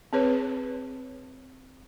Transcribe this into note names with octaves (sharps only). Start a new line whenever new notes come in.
C4 G#4 B4 C#5